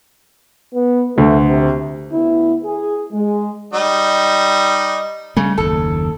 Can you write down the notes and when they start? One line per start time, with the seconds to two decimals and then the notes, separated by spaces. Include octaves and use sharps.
0.75 B3
1.18 D2 A3
1.49 C3
2.12 D2 B3 E4
2.64 G#4
3.13 G#3
3.73 G3 D#4
5.37 C#3 G3 A3
5.58 F#1 D#2 A4